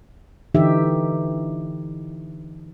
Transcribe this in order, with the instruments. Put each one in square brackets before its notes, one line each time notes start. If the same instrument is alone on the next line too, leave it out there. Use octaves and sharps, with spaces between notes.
[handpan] D3 E3 D#4 G4 E5